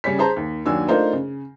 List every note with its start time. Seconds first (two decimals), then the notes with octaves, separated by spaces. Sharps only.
0.04 C#3 G3 C#4 C#5 B6
0.19 G#4 C5 A5 A#5
0.36 D#2
0.66 D#2 F#3 D4 G#5 E6
0.88 A3 D4 D#4 F4 A#4 C5
1.13 C#3